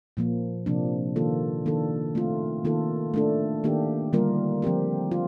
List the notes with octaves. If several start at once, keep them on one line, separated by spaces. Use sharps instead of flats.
A#2 F3 A#3
C3 F3 A#3 D4
D#3 A#3 F4 A4
D#3 A#3 D4 A4
A3 C4 F4
D#3 A#3 F4 A4
A3 D4 A4
D#3 A#3 D4 G4
D3 G3 A#3 F4 A#4
F3 C4 G4 A#4
F4